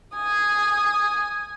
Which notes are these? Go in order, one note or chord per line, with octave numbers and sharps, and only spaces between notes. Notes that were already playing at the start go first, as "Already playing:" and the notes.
G#5 D#6